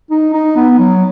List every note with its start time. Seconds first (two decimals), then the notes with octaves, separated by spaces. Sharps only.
0.11 D#4
0.33 D#4
0.56 B3
0.79 F#3